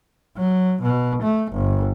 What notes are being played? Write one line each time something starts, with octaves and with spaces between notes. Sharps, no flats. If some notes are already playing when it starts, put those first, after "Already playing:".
F#3
B2
A3
G1